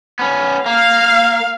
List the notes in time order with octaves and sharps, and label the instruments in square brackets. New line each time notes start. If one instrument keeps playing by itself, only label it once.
[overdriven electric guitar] B3 C#4
[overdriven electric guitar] A#3 [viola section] F5